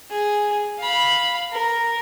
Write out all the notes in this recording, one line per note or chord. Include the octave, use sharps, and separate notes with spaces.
G#4
F5 B5
A#4